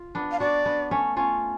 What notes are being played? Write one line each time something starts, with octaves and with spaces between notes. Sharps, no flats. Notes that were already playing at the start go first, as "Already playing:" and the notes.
Already playing: F4
B3 D4
F5
D4 F#4 D5
B3 D4
A3 C#4
C#4 F4